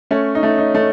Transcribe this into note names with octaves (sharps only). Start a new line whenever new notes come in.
A3 C#4
D#4
A3
D#4
A3